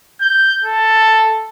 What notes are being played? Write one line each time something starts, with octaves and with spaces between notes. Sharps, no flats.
G6
A4